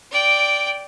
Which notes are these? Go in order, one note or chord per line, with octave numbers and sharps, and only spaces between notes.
D5 G5